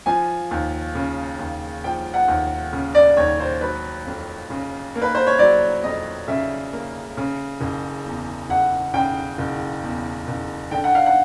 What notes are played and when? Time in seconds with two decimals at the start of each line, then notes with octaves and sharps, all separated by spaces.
0.06 F3 G#5
0.51 D#2
0.95 C#3
1.39 D#2
1.84 F3 G5
2.14 F#5
2.28 D#2
2.73 C#3
2.95 D5
3.17 D#2 C#5
3.40 C5
3.61 F#3 B4
4.06 F2
4.50 C#3
4.95 A#3
5.02 B4
5.15 C5
5.27 C#5
5.39 F#3 D5
5.84 F2 D#5
6.28 C#3 E5
6.73 A#3
7.17 C#3
7.61 F#1
8.06 E2
8.50 F#1 F#5
8.94 C#3 G5
9.38 F#1
9.84 E2
10.28 F#1
10.71 D3 G5
10.84 F#5
10.95 F5
11.06 F#5